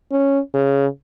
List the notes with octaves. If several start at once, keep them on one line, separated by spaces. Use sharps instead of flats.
C#4
C#3